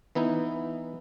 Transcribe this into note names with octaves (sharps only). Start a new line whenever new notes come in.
E3 B3 D#4 E4